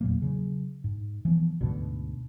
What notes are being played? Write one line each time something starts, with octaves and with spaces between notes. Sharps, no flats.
E2 A#2 F#3 A#3
C#3 F#3
G#2
E3 F3 B3
D2 G#2 B2 D3